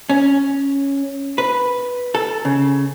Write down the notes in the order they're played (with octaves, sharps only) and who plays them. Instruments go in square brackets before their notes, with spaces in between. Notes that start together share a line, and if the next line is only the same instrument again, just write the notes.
[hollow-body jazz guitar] C#4
B4
A4
C#3